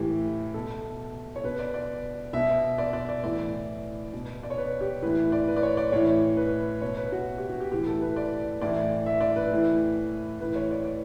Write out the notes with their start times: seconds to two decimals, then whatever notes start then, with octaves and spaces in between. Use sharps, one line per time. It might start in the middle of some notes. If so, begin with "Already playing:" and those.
Already playing: A2 E3 G4
0.54 B2 A4
1.36 C#5
1.44 B2 B4
1.59 D5
1.74 D5
2.33 B2 E5
2.78 D5
2.93 D5
3.09 D5
3.24 A2 E3 D5
4.13 B2
4.43 D5
4.50 C#5
4.58 B4
4.81 G4
5.02 A2 E3 B4
5.32 D5
5.48 B4
5.57 D5
5.63 C#5
5.77 D5
5.92 A2 E3 C#5
6.37 B4
6.82 B2 C#5
6.97 B4
7.12 F#4
7.38 G4
7.49 F#4
7.60 G4
7.72 A2 E3 G4
7.87 A4
8.02 B4
8.16 D5
8.61 A2 E3 D5
9.06 E5
9.21 D5
9.36 B4
9.51 A2 E3
10.40 A2 E3 B4
10.56 C#5
10.71 D5
10.85 D5